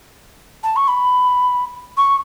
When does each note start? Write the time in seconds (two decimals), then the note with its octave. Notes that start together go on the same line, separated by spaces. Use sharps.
0.63 A5
0.76 C#6
0.88 B5
1.97 C#6